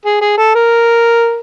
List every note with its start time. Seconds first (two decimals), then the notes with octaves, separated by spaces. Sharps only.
0.05 G#4
0.21 G#4
0.38 A4
0.55 A#4